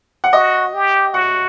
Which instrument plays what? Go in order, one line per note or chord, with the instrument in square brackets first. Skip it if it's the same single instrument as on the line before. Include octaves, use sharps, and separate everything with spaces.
[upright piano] F#5
[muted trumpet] F#4 [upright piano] D#5
[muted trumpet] G4
[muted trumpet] F#4 [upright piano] F#5